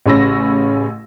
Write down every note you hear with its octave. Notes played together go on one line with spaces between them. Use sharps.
A1 C#3 C#4 B5 E6 A#6